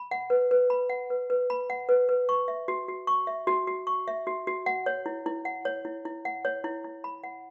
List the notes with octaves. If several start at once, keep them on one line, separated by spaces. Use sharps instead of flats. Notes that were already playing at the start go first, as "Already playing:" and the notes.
Already playing: B5
F#5
B4
B4
B5
F#5
B4
B4
B5
F#5
B4
B4
C#6
E5
F#4
F#4
C#6
E5
F#4
F#4
C#6
E5
F#4
F#4
F#5
C#5
E4
E4
F#5
C#5
E4
E4
F#5
C#5
E4
E4
B5
F#5